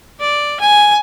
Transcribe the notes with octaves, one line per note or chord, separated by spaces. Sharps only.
D5
G#5